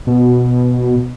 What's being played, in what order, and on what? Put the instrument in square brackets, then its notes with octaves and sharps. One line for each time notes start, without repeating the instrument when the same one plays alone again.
[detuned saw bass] B2